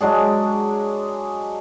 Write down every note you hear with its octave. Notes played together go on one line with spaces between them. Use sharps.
F#3 G#3 D4 G#4